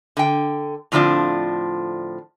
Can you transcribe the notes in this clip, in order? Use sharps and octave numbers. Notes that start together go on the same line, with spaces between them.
D3 G5
A2 D3 F3 C4 D4 F4